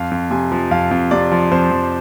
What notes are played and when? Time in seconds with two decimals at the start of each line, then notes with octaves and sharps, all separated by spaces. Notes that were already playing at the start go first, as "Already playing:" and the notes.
Already playing: F2 F5
0.11 F2
0.31 C3 G#5
0.52 F3
0.71 F2 F5
0.91 F2
1.11 C3 D5
1.32 F3
1.51 F2 C5
1.71 F2